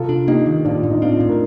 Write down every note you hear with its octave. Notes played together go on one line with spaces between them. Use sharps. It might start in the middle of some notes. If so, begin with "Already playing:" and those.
Already playing: C3 F4 A4
D4
A#3 D#4 G4
D#3
A2 D4 F4
A2
D#4
C4 D4 F4
A2
A#4